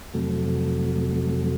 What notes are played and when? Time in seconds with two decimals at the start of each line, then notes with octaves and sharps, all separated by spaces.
0.14 F2 C3 F#3 A3